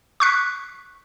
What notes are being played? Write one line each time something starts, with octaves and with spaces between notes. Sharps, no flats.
C#6 F#6 B6